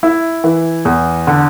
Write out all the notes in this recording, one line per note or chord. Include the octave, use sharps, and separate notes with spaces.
E4
E3
E2
D3